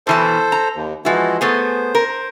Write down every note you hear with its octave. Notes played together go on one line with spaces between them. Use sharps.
B2 E3 A4 C5 A5
A#5
D#2
E3 F3 G#3 E4 F#4
A3 B3 G#4 C5
A#4